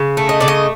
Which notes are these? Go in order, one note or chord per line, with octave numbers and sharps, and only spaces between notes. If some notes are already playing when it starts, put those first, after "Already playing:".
Already playing: C#3
A3
D#5
C#3 D5
D#5